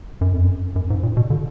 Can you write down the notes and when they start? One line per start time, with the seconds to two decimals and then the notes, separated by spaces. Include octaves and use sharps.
0.21 F#2
0.33 F2
0.45 F#2
0.76 F#2
0.90 G#2
1.03 A#2
1.17 B2
1.30 D3